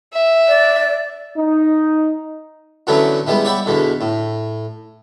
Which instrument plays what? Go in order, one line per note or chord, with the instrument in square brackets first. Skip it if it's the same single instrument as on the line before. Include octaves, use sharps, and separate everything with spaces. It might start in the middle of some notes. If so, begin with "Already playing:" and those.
[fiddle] E5
[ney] D5
[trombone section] D#4
[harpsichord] D3 E3 F#3 A3 B3 C#4
E3 G3 G#3 B3
C#5 D5 E5 F#5 G5 B5
E2 B2 D3
A2